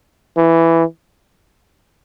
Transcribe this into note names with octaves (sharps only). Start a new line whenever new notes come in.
E3